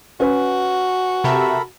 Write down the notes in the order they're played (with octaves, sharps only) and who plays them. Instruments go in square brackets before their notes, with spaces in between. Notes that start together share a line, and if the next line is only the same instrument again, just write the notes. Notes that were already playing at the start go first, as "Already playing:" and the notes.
[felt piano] C#4 B4 [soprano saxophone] F#4
[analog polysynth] C3 G4 E5 [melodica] A4 A#4 B5